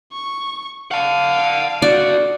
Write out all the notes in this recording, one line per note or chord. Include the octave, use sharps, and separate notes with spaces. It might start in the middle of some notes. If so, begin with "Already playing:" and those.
C#6
F5 F#5 A5
D4 F#4 D5